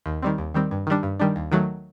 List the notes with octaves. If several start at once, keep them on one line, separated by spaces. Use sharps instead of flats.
D#2
D#3 G3 C4
D#2
D#3 G3 C4
G2
D#3 G3 D4
G2
D#3 G3 D4
D#2
D#3 F#3 A3